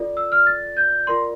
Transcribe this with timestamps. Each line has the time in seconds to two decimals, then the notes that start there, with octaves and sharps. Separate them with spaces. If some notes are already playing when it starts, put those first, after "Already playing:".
Already playing: F4 A4 D5
0.17 E6
0.32 F6
0.47 A6
0.77 G6
1.07 F4 A#4 D5 C6